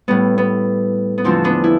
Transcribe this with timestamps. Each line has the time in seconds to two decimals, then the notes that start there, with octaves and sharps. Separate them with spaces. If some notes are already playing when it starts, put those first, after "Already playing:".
0.08 A2 G3 B3
0.38 B3
1.18 B3
1.24 E2 D3 F3 A3 C4
1.44 B3 D4
1.64 E4